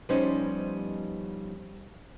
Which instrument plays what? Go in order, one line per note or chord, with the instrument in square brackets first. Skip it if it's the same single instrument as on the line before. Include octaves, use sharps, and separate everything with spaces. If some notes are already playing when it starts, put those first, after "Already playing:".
[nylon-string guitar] F3 G3 B3 C#4 D#4 C5